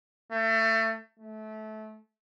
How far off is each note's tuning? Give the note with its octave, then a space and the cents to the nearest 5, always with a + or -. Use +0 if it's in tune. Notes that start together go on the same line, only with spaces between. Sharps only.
A3 +25
A3 -25